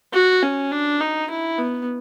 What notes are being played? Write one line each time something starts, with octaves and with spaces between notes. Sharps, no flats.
F#4
C#4
D4
D#4
E4
B3